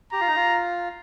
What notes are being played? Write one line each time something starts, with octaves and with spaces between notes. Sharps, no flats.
G4 A#5
F4
D#4
F4